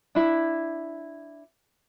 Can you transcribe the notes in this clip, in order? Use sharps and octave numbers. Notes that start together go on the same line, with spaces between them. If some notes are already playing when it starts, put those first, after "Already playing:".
D4 E4